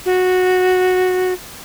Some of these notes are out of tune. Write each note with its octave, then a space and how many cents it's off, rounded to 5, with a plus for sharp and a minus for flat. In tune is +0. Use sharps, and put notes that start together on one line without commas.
F#4 -10